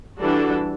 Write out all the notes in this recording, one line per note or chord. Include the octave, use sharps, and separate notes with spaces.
E3 G3 D4 F#4 A4